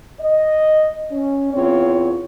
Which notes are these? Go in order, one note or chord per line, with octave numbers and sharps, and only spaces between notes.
D#5
C#4
E2 C4 F4 C#5